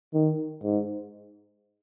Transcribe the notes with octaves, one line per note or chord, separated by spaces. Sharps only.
D#3
G#2